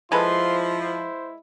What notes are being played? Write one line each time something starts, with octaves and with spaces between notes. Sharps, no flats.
F3 G#3 E4 A4 B4 C6
C5